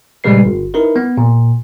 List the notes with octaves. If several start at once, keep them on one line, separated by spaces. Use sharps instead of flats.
A#2 C#3 G3 G#3 B4 C7
G1
D#4 E4 A#4 B4
B3
A#2